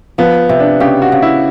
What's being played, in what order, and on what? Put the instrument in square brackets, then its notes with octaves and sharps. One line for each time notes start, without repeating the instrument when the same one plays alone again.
[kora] F3 [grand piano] B3
[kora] C3
[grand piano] D4
[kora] C#3 [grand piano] G4
[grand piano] F#4
[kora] C#3
[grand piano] E4